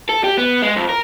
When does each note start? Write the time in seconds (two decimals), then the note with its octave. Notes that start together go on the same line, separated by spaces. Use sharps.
0.09 A4
0.24 G4
0.38 B3
0.62 G#3
0.77 F2
0.89 A#4